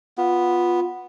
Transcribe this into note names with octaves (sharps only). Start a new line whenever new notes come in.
B3 F4